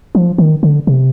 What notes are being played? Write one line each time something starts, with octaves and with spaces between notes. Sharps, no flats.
F3
D#3
D3
C3